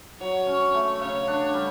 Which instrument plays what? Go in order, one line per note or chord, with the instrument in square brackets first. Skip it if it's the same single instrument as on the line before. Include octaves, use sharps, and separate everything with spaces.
[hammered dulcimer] F#3 [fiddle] C#5
[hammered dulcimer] C#4
A3
[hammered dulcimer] C#3 [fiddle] C#5
[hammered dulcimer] D4
G3